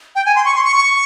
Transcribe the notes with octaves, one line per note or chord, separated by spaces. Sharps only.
G5
G#5
C6
C#6
C6
C#6
C#6